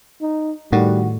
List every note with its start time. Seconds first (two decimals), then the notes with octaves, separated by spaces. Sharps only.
0.22 D#4
0.72 A2 D#3 G3 F#4